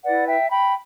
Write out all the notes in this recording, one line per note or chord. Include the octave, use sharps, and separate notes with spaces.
E4 B4 D5 F#5
E5 G5
G5 B5